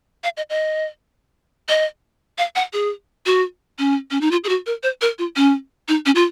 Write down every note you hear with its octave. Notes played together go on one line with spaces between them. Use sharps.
F5
D#5
D#5
D#5
F5
F#5
G#4
F#4
C#4
C#4
D#4
F4
G#4
F#4
A#4
C5
A#4
F4
C#4
D#4
C#4
F4